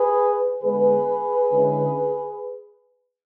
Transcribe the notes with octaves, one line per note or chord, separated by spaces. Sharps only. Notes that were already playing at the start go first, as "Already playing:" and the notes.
Already playing: G#4 B4
D3 G#3 B3 G#4 B4
D3 G#3 C#4 E4